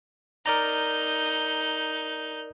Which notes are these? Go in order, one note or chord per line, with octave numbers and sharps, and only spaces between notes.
D#4 A#4 D5 A#5 G6